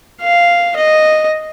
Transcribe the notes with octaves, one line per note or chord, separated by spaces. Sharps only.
F5
D#5